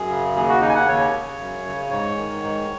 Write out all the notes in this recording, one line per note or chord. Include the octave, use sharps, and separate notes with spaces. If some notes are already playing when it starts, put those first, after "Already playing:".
Already playing: F#2 G#4
C#3
D#2 G#4
F#4
C#3 D#4
G#5
F#5
D#2 C#5
C#3
F#2
C#3
G#2 C#5
D#3
G#2